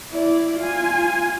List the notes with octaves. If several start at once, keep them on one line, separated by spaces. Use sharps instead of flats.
E4 D5
F4 G#5